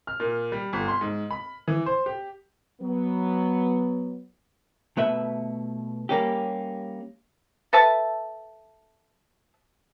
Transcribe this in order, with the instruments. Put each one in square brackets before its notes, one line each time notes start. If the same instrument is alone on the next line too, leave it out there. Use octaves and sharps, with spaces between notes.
[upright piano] F6
A#2
G3
G1
C6
G#2
B5
E3
C5
G4
[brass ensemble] F#3 B3
[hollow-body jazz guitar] B2 A3 B4 E5
G3 A#3 C#4 G4
[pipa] A4 B4 E5 A5